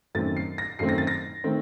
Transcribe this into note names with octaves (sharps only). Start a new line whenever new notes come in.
F#2 D#3 A3 C4 A6
C7
A#6
F#2 D#3 A3 C4 C7
A#6
A6
A#6
D#3 A3 C4